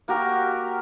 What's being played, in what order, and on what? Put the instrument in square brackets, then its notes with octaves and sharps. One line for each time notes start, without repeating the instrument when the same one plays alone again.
[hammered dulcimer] A#3 F#4 G4 A#4